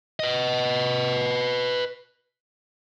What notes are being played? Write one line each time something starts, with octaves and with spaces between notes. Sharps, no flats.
B4 D#5